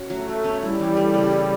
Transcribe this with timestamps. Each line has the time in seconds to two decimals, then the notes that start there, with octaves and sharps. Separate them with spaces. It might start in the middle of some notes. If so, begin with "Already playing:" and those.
Already playing: C#4 F#4
0.10 F#3 A3
0.28 F#3
0.44 C#4
0.62 G3 E4
0.79 E3
0.97 A3
1.14 C#3
1.31 E4